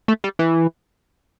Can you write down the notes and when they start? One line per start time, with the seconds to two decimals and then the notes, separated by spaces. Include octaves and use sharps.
0.08 A3
0.24 G3
0.39 E3